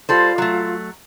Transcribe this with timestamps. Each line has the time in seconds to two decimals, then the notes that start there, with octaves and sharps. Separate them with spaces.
0.09 G3 F4 A4 C5
0.38 F#3 A3